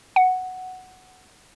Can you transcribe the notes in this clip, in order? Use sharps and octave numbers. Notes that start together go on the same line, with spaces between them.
F#5